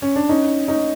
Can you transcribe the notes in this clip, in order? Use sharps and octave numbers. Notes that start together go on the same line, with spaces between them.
C#4
D4
C#4 D#4
C#4 D#4